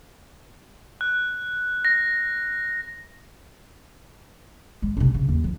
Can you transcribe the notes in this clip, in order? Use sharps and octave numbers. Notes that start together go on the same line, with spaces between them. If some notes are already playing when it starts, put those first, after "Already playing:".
F#6
A#6
G#3
C3 D4
C#3
D#2
F3